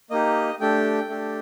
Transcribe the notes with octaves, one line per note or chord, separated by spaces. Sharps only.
A#3 D#4 G4 D#5
A3 D4 G4 G5
A3 D4 G4